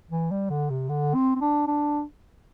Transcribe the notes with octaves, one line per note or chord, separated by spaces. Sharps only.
E3
G3
D3
C3
D3
C4
C4
D4
D4